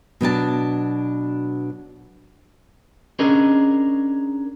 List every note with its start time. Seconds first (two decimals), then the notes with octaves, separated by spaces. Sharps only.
0.21 B2 F#3 D4 A5
3.19 C#4 D4 G#4 A#4 D#5